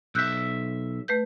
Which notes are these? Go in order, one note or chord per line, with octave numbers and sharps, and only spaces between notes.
B1 E5 E6 F#6 G6
A3 B4 G6